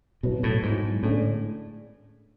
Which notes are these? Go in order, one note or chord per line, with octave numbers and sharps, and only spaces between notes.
B2 F#3 B3 E4 B4
A2
G#2 F#3 B3 E4
A2 D3 G#3 C#4 G#4 D5